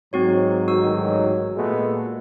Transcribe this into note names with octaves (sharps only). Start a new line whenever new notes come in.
G#2 F#3 C4 F#4 C#5
A1 D#3 F#4 E6
A#2 G#3 A3 B3